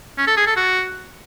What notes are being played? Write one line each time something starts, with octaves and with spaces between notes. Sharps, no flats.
C#4
A4
G#4
A4
F#4